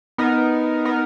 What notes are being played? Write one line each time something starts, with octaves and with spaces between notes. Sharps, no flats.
B3 D#4 A#4
B3 D#4 A#4